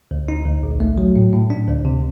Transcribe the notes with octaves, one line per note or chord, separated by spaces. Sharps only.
D2
D#4
D2
A#1
A3
F#3
A2
A2
D4
D2
C3